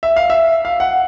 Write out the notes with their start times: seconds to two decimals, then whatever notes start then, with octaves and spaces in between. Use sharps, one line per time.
0.03 E5
0.16 F5
0.30 E5
0.65 F5
0.80 F#5